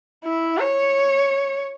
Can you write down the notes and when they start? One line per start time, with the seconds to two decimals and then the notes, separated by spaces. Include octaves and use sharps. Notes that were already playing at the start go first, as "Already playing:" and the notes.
0.25 E4
0.59 C#5